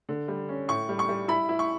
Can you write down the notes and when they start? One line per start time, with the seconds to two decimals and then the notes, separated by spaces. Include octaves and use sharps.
0.09 D3
0.28 G3
0.49 C#4
0.68 A2 C#6
0.89 G3
0.99 C#6
1.09 G3
1.28 E4 B5
1.49 E4
1.59 C#6